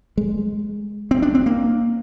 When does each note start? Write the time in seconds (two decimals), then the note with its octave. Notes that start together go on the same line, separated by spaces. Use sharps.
0.17 G#3
1.11 C4
1.22 D4
1.35 C4
1.46 A#3